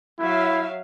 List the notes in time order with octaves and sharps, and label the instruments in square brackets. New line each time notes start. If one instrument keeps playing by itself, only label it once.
[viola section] F#3 E5 F5 [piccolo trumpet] E4